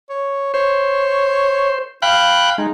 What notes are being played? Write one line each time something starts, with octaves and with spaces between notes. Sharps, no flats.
C#5
C5 C#5
F5 G5 B5 F#6
G#3 D#4